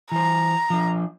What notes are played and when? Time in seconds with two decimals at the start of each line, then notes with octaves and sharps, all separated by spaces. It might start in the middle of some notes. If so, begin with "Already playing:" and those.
0.12 E3 C5 A#5
0.70 F3 D4